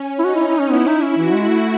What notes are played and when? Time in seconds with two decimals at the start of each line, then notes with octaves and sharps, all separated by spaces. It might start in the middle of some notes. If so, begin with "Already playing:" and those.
Already playing: C#4
0.19 E4
0.24 D#4 F#4
0.35 E4
0.47 E4
0.59 C#4
0.70 B3 E4
0.87 D#4
1.02 C#4
1.17 E3 F#4
1.33 G#3
1.48 A3